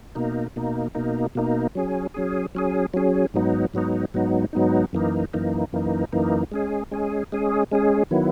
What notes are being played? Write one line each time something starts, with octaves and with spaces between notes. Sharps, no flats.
B2 A#3 D#4
B2 A#3 D#4
B2 A#3 D#4
B2 A#3 D#4
F#3 C#4 G#4
F#3 C#4 G#4
F#3 C#4 G#4
F#3 C#4 G#4
G#2 F#3 B3 D#4
G#2 F#3 B3 D#4
G#2 F#3 B3 D#4
G#2 F#3 B3 D#4
F#2 E3 A#3 D#4
F#2 E3 A#3 D#4
F#2 E3 A#3 D#4
F#2 E3 A#3 D#4
G#3 C#4 G#4
G#3 C#4 G#4
G#3 C#4 G#4
G#3 C#4 G#4
D#3 F#3 B3 E4